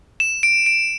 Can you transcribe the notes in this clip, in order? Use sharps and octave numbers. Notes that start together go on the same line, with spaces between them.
E7
D7
D7